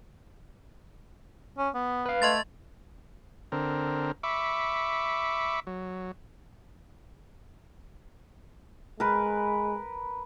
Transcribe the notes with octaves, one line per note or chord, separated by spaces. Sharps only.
C#4
B3
B4 F5
A3 D#5 C6 A6
D3 C4 A#4
E5 B5 C#6 D6
F#3
G#3 A#4 B4